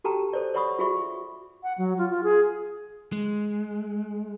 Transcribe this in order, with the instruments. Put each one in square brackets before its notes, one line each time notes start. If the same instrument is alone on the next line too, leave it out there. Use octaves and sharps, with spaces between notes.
[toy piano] F#4 G4 A4 G5 A5 A#5
A4 C5 D5
C#5 D5 F#5 B5 C#6 D#6
F4 F#4 G#4 E5 B5 C#6
[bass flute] F#5
F#3
F4
F4
G#4
[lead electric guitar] G#3